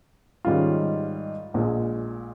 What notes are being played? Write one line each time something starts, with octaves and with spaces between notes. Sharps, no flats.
G#2 D#3 G3 C#4 F4
A#1 A#2 G#3